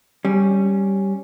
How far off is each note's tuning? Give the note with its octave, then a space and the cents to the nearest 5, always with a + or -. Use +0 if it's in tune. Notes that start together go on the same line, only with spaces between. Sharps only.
G3 -5 C#4 +0